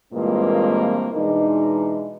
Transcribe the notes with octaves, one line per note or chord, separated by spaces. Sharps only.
G2 A#2 E3 G#3 A#3 C4
B2 E3 G#3 D4 D#4